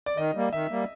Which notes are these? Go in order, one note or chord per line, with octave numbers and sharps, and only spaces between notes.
D5
D#3 D#5
G3 A#3
D#3 E5
G3 A#3